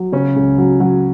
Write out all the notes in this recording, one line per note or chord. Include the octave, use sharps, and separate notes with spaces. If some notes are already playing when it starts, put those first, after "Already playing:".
Already playing: F#3
C#3 C#4
C#2
F#3
F#3